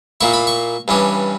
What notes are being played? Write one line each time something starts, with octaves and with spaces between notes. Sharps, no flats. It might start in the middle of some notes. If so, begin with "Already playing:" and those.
A#2 A#3 E4 C#6
B5
C#6
G2 E3 G3 C#4